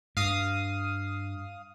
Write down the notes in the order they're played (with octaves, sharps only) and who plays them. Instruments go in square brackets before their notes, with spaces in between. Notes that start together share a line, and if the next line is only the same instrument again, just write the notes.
[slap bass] G2 [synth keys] F5 D#6